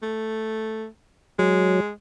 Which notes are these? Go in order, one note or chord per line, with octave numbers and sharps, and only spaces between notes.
A3
F#3 G#3